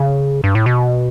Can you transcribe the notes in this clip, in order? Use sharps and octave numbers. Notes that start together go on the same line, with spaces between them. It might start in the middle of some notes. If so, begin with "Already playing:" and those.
Already playing: C#3
G2
A2
B2